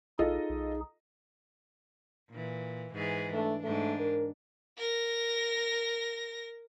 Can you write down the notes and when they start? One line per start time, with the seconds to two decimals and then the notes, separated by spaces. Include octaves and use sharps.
0.19 A#1 D#4 F4 G#4 A4 D#5
0.49 B1
2.30 A#2 E3
2.94 G#2 E3 G#4
3.33 A3 D4
3.64 G#2 A3 D4
3.99 A#4
4.78 A#4 A#6